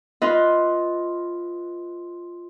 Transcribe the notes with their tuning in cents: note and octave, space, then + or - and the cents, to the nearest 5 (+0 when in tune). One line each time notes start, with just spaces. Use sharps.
F4 +0 B4 +0 D#5 +15